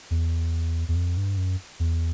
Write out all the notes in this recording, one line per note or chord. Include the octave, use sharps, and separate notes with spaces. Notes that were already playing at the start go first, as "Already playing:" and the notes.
E2
E2
F2
G2
F#2
E2